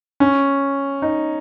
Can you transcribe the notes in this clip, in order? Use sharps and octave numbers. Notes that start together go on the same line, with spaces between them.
C#4
D#4